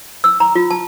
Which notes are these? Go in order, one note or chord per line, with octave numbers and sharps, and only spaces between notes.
E6
A#5
F4
A5